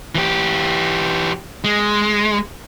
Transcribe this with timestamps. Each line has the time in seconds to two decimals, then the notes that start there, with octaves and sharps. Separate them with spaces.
0.15 E3 G4
1.64 G#3